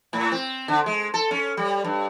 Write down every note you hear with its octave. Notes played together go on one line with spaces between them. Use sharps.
A2
C4
D3
G#3
A4
C#4
G3
G2